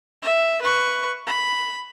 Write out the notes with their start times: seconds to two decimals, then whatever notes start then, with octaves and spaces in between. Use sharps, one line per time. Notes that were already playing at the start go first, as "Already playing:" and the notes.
0.22 E5
0.62 B4 C#6
1.27 B5